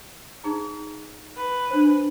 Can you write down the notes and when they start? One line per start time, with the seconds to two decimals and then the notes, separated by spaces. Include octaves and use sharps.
0.44 D#4 G#4 A#5
1.37 B4
1.70 D4 C5